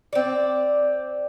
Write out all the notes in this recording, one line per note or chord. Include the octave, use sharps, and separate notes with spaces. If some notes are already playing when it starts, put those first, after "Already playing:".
C4 D5